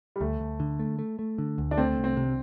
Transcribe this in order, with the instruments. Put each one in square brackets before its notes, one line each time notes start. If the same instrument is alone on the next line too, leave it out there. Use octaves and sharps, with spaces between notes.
[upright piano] G3
[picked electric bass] D2 [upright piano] A3
[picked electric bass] D2
D3
A3
A3
A3
D3
D2
[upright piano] D4
[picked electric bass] A3 [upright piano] C4
[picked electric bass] C2
[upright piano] C4
[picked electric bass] C3